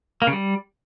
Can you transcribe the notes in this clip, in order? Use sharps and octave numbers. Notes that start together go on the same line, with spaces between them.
A#3
C#3
G3